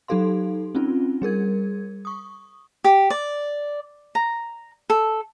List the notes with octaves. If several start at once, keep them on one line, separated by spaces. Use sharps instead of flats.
F#3 D#4 G4 A4 F5 C6
C4 C#4 D#4 F4
G3 G#4 A#4 G#6
C#6 D#6
G4
D5
A#5
A4